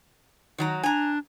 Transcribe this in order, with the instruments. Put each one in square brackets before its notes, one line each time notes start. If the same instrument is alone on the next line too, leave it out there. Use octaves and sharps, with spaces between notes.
[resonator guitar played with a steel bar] D#3 F#3 A#5
[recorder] D4 [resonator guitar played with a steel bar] G#5 A#5